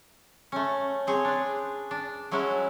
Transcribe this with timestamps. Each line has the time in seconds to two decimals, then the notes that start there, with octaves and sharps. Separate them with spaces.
0.52 A3 C#4
1.07 C4 G#4 C#5
1.25 D4 B4
1.91 D4
2.31 F#3 G#3 C#4 E4 F#4